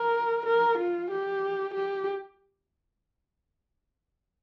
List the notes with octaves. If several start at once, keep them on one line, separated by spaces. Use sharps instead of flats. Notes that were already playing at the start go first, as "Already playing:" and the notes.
Already playing: A#4
A#4
F4
G4
G4